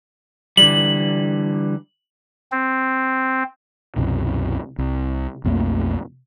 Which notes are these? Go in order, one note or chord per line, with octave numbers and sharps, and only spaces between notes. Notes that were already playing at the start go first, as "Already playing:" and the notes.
D3 E3 G3 F#7
C4
C2 F#2 B2
C2
B1 F2 A3 A#3